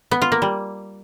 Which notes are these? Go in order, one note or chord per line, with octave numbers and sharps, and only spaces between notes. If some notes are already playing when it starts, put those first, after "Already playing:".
B3
F4
A#3
G3